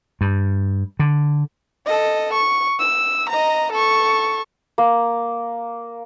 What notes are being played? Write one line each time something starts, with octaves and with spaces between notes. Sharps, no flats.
G2
D3
A4 D#5
C#6
E6
D#5 A#5
A4 C#6
A#3